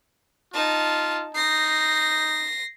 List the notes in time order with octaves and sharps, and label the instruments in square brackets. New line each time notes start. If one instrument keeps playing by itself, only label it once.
[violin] D#4 A5 [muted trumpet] F4
[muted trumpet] D#4 [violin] A#6 C7